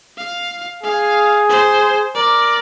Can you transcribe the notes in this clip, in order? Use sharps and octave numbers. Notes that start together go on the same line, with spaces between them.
F5
G#4 F5
C5
A#4 D5